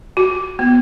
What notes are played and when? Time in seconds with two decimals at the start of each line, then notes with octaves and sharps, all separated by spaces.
0.17 F#4
0.59 B3